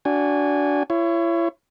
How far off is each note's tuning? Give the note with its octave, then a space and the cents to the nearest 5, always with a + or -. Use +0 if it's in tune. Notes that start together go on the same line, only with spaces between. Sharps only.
D4 -20 F#4 +0 G#5 -20
E4 +35 C#5 +0